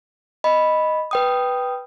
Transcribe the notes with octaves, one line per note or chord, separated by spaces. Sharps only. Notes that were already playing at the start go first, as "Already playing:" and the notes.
D#5 B5
B4 G5 D#6